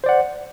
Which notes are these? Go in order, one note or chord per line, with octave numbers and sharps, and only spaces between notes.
C5 D5 F#5